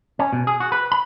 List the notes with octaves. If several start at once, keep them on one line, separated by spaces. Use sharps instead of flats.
C#4
B2
G#4
F#4
B4
B5